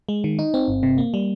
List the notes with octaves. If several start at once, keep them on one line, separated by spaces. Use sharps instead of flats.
G#3
D#3
D#4
C4
G1
C3
A#3
G3